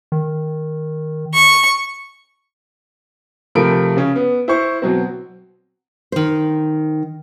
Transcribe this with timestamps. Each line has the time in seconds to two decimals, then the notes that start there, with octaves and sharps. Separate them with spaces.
0.12 D#3
1.34 C#6
3.55 C3 F3 A3 A#4 B5 D7
3.97 C#3 C#4
4.16 B3
4.48 E4 C5 C#6
4.82 B2 F#3 C4
6.12 D#3 C5